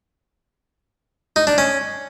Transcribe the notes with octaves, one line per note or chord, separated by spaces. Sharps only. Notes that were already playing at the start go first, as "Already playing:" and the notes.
D#4
D4
C#4